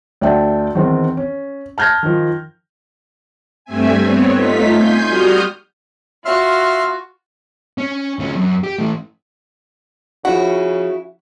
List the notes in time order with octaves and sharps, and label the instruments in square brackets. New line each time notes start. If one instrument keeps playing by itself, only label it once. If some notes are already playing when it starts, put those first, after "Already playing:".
[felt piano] D2 D5 E5 G5 A5
E2 D#3 C4
C#4
A5 F6 G6 G#6 A#6
D#3 F3
[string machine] G2 G3 A3 C4 E5 G#5
B3 C4 C#5
A3 D#4 F4 B6
G#5 C6 G6
G3 F#4 D#6 F6 G6
[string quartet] F4 F#4 [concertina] E5 C6 F6
[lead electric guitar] C#4
D2 C#4
F#2
G4
E3 A3
[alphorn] C#3 [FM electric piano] F3 C#6 [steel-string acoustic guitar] E4 F#4 [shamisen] F#5